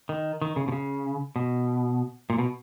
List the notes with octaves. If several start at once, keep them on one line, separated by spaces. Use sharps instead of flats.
D#3
D#3
C#3
B2
C#3
B2
A#2
B2